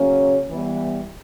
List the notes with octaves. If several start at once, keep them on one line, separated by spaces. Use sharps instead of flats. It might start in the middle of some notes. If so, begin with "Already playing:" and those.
Already playing: C#3 F#3 A#3 C#4
E3 G3 B3 E4